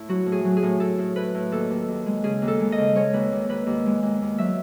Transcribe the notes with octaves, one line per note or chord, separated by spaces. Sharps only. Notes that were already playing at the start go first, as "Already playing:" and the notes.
Already playing: A2 E4
F#3 F#4
A2
G#4
F#3
G#4
A2
A2 A4
A2
A2 B4
A2
D#2 A4
D#2
D#2
G#3
C#3 G#4
D#2
A4
G#3
D#5
C#3
G#3 C#5
D#2 B4
D#2
D#2 B4
D#2
G#3
D#2
D#2
F#3 E5